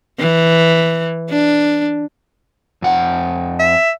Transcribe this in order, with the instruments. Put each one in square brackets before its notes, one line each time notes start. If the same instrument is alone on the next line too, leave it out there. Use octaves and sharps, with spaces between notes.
[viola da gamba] E3
D4
[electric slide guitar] F2 F#5
[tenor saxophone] E5